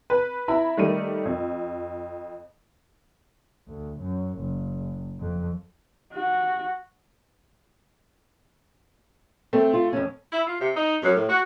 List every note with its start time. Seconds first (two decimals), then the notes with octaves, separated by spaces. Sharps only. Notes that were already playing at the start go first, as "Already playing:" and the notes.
0.10 B4
0.48 E4 E5 A#5 B5
0.77 D#3 G3 A3 A#4 D#7
1.25 F2
3.68 D2
3.99 F#2
4.38 F#1
5.20 F2
6.14 F#4
9.53 A3 C4
9.73 F4
9.93 F2 C#4
10.32 E4
10.46 F4
10.60 C3
10.75 D#4
11.03 F#2
11.15 A2
11.29 F#4